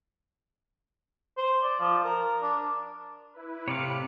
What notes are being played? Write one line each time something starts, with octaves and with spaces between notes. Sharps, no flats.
C5
D5
F3
A#4
D4
E4 B4
A2 C3 C#5 D5 F5 B5 C#7